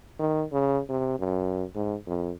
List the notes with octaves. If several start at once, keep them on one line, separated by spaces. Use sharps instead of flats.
D#3
C#3
C3
F#2
G#2
F2